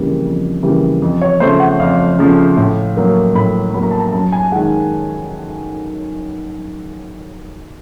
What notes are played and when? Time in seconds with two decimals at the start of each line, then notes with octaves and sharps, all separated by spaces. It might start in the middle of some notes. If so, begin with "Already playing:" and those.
Already playing: F2 C#3 E3 G3 A#3
0.24 F2
0.63 C#3 E3 G3 A#3
1.02 F2
1.22 C#5
1.40 C#3 F3 A3 C5
1.60 F#5
1.80 F2 F5
2.19 C#3 F3 A3
2.57 A2
2.97 F#3 A#3
3.35 A2 B5
3.74 F#3 A#3 B5
3.83 A#5
3.91 A5
4.00 A#5
4.12 F#2 A5
4.32 G#5
4.52 D#3 G#3 F#5